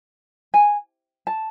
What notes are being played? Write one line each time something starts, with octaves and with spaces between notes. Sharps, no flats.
G#5
A5